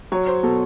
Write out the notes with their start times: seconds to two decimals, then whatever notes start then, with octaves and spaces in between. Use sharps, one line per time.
0.12 F#3 C#5
0.27 C5
0.43 B2 A4